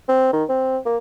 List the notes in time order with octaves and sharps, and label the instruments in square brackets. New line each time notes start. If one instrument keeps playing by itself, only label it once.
[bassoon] C4
D#3
C4
A#3